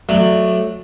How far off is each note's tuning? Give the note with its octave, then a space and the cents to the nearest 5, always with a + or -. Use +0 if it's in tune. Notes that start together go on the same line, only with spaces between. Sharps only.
F#3 -10 A3 +0 D5 +15